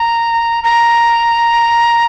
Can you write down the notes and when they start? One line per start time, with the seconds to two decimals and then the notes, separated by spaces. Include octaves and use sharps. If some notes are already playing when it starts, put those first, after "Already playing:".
Already playing: A#5
0.64 A#5